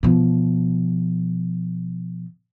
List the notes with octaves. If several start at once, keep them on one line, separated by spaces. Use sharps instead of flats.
B2 F3